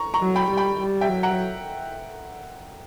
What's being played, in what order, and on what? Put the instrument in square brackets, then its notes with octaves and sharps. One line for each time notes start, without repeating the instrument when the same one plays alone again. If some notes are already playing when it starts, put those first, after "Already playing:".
Already playing: [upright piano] A#5 C#6
A#5 C#6
[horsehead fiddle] F#3
[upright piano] G5 B5
[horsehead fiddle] G3
[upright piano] G5 B5
[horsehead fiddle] G3
[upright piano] E5 G5
[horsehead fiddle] F#3
[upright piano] F#5 A#5